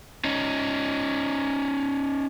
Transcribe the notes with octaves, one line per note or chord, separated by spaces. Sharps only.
C#4 D#4